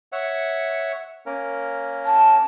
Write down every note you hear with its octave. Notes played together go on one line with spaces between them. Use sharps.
C#5 E5 F#5
A#3 C#4 A#4
A5